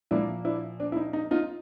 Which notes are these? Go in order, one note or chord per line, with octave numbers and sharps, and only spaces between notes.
A#2 F3 A#3 D4 E4
D4 E4
D4
E4
D#4
D#4
D#4 F4